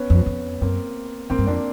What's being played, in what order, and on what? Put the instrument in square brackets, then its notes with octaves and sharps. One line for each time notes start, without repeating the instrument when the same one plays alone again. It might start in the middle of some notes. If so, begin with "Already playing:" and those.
Already playing: [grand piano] B3 C#4
[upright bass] F2
F2
[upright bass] F#2 [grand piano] A#3 C4
[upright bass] G#2 [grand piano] A#3 C4
[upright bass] G2
[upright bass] F2 [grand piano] C4 D4